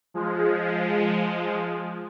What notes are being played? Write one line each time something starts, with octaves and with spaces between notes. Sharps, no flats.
F3 G#3